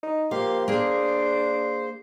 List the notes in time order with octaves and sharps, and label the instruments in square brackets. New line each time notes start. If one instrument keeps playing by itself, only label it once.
[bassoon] D#4
[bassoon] F3 [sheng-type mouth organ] A#3 G4 C6 [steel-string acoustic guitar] F5
[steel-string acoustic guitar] A#3 G#4 [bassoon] D4 [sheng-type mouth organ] C5